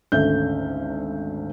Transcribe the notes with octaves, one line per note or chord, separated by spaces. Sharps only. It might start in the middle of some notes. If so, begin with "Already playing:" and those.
G#1 D2 C#4 A4 E5 G6